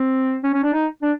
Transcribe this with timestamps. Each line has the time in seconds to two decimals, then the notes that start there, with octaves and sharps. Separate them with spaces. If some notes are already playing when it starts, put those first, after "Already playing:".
Already playing: C4
0.44 C#4
0.54 C#4
0.63 D4
0.73 D#4
1.03 D4